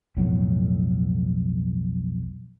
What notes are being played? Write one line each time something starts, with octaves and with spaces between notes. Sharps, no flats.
B1 F2 A2 F#3